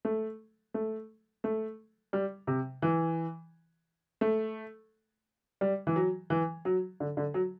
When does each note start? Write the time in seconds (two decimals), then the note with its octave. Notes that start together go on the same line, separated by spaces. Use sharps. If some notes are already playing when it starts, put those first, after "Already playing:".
0.05 A3
0.74 A3
1.44 A3
2.13 G3
2.47 C3
2.82 E3
4.21 A3
5.61 G3
5.87 E3
5.96 F#3
6.30 E3
6.65 F#3
7.00 D3
7.17 D3
7.34 F#3